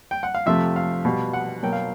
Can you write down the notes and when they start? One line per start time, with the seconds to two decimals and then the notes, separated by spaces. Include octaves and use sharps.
0.11 G5
0.23 F#5
0.35 F5
0.46 F2 C3 F3 A3 E5
0.76 F5
1.05 B2 G3 B3
1.33 F#5
1.62 B2 F#3 A#3 G5
1.73 F5